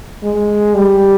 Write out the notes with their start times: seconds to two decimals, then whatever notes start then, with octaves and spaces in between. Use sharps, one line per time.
0.23 G#3
0.74 G3